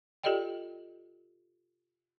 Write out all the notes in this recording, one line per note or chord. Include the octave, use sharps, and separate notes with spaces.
F4 G4 A4 D5 D#5 G5